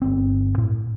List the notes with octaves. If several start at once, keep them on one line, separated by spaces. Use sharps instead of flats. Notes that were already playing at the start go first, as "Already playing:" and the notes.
G1 C4
A2